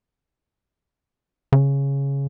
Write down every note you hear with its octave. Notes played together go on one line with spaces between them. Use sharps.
C#3